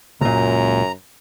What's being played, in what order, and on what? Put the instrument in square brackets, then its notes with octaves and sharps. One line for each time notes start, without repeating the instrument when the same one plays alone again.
[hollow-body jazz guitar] C#2 A#2 [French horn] F#2 [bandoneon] A#5